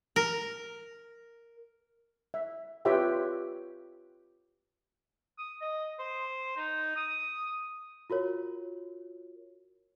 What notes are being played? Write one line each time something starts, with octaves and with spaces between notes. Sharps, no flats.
A#4
E5
F4 G4 B4 C#5 E5 G5
D#6
D#5
C5
D#4
D#6
F4 F#4 A#4 C#5